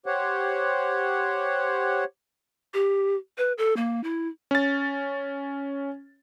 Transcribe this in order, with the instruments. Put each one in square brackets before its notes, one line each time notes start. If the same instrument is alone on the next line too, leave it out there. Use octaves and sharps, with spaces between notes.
[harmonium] G4 C5 C#5 F#5
[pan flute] G4
B4
A4
A#3
E4
[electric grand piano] C#4 A6